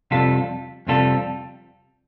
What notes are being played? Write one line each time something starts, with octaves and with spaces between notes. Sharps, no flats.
F2 C3 G3 F4 A4
F2 C3 G3 F4 A4